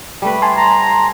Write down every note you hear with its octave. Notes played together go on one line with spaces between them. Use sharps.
G3 A3 B4
G#5 A5 C6
A#5